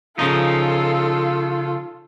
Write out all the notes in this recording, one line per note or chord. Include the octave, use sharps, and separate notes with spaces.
C#3 F3 D#4 F4 A4